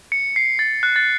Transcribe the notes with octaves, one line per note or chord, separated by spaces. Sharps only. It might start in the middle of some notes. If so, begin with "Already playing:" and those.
C#7
C7
A6
F#6
A6